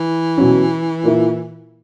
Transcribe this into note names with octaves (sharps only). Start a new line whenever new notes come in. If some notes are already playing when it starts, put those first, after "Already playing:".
Already playing: E3
B2 F#3 C#4
A#2 A#3 E4